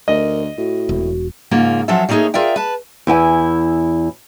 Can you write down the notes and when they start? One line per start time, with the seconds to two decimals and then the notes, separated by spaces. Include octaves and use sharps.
0.08 D2 A#4 D#5
0.58 A2 F#4
0.89 E1
1.51 G#2 C#3 A#3 C#4 F4
1.88 F3 F#3 C#4 A4 E5
2.09 G3 A3 A#3 D#4 G#4 C#5
2.34 F4 G#4 A#4 D5 E5 G5
2.56 B4 A5
3.07 E2 E4 G5 G#5